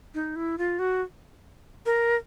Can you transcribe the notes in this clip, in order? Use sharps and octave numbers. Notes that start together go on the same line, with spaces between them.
D#4
E4
F4
F#4
A#4